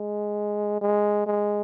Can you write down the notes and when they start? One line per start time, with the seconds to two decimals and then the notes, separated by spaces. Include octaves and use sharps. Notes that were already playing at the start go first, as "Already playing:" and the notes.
Already playing: G#3
0.81 G#3
1.27 G#3